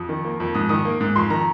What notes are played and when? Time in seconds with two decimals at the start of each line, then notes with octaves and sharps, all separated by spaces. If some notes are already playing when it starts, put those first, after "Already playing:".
Already playing: F2 D#6
0.09 D#3
0.25 A#3
0.40 F2
0.55 G#2 D#6
0.69 D#3 D#6
0.85 A#3
1.00 G#2
1.16 F2 C6
1.30 D#3 A#5